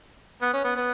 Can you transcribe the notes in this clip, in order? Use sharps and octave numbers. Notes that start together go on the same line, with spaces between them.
B3
C#4
B3
B3